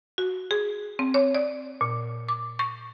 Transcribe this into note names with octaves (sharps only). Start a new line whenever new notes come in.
F#4
G#4
C4
C#5
D5
A#2
D6
C#6